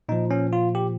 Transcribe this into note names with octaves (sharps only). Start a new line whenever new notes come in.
A#2 F3 D#4
C#4
F4
G4